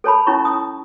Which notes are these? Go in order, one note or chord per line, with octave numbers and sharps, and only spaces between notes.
A4 C#5 A5 B5
C#4 D#4 E4 C#5 A#5 C#6
D#6